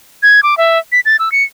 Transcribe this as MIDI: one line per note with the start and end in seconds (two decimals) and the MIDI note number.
0.23 0.40 92
0.43 0.57 86
0.57 0.79 76
0.92 1.00 95
1.05 1.17 93
1.19 1.32 88
1.32 1.44 97